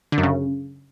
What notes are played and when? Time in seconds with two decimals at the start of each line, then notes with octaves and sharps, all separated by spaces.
0.12 D3
0.18 F#2
0.23 C#3